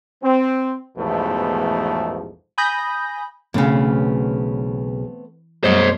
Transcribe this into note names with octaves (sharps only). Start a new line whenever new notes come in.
C4
A1 E2 G#2 B2 F3 A3
G#5 B5 D#6 G6 A#6
B1 C#3 E3 A3 B3 C4
F#2 B2 G3 A3 A#3 C5 D#5